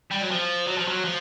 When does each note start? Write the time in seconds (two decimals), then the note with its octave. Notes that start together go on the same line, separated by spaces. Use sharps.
0.11 G3
0.21 F#3
0.31 F3
0.67 F#3
0.78 F3
0.88 F#3
1.05 F3